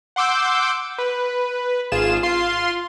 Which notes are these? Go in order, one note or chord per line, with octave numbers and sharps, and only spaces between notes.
F#5 C6 D6 E6 G6
B4
G#1 F4 G#4 E7
F4 C6